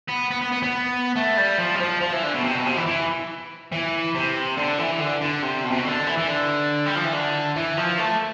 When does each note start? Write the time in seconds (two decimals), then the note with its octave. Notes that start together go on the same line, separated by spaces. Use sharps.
0.09 B3
0.31 B3
0.41 B3
0.52 B3
0.63 B3
1.16 A3
1.37 G3
1.58 F3
1.75 G3
1.80 F3
2.01 F3
2.12 E3
2.22 D3
2.34 B2
2.44 C3
2.54 B2
2.66 C3
2.76 E3
2.86 E3
3.72 E3
4.15 C3
4.58 D3
4.79 E3
5.00 D3
5.21 D3
5.43 C3
5.64 B2
5.71 C3
5.78 B2
5.85 D3
6.07 E3
6.18 E3
6.28 D3
6.86 G3
6.96 F3
7.04 E3
7.13 D3
7.56 E3
7.77 F3
7.99 A3